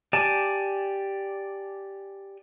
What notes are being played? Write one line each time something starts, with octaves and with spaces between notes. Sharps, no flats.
G4 D5 G#5 A5